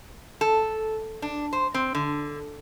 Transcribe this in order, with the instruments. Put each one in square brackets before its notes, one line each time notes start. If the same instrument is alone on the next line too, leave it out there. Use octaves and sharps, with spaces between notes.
[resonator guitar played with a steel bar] A4
D4
C5
C4
D3